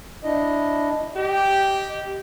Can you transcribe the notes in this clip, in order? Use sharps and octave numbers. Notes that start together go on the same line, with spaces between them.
D4 E4 D#5
G4 D#5